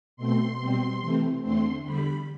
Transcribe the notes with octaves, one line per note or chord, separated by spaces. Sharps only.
B2 A3 C4 C6
B2 G3 C4
C3 E3 A3 C4
E2 D3 A3 C4 C6
E2 D3 G3 B5